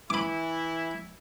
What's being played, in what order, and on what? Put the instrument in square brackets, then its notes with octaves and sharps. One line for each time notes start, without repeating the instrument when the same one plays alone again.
[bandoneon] E3 [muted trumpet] E4 [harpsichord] B5 D6